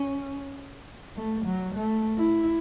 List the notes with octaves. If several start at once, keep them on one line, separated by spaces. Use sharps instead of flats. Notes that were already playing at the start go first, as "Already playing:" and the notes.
Already playing: C#4
A3
F#3
A3
E4